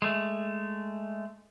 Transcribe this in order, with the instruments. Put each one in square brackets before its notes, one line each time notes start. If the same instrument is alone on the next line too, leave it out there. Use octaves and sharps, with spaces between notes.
[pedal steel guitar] G#3 A3